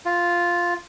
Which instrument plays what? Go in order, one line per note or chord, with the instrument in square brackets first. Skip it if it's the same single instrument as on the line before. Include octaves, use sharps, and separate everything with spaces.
[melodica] F4